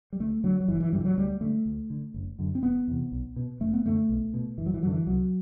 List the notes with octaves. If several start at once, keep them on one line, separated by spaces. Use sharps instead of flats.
G3
D2 A3
D3 F#3
F#3
G1 E3
E3
G2 D3 E3 G3
F#3
D2 G3
D3 A3
D2
D3
F#1
F#2 D3
C4
E1 B3
E2 C3
B1
B2
F#1 A3
B3
F#2 D3 A3
B1
B2
F#1 E3
F#3
E3
F#2 D3 E3 F#3
C2 F#3